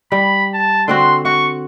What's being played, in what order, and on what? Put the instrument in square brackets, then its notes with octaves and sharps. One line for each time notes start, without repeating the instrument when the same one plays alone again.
[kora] G3 [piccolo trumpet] B5
[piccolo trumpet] A5
[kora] D3 C4 F#4 [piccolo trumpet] C6
[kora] F#4 [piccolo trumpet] C#6